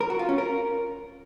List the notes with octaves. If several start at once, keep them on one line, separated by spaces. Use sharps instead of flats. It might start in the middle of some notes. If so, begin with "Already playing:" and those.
A#4
F#4
F4
C#4
A#4